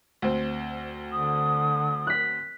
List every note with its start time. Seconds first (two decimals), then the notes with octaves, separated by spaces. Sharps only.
0.22 D2 C4
1.12 D3 D#6
2.07 F#6 B6